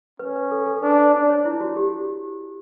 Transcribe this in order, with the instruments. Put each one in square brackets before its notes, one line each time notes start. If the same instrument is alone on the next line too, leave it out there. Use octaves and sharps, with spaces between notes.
[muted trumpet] C#4 [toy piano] B4
[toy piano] B4
A4
A4
[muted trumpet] D4 [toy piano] B4
[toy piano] D5
[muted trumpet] D4 [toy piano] D5
[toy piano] C#5
E4
F#4
G4